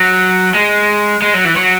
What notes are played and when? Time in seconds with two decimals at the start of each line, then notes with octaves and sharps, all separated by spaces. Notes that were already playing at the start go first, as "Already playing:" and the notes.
Already playing: F#3
0.55 G#3
1.22 G#3
1.34 F#3
1.45 E3
1.56 F#3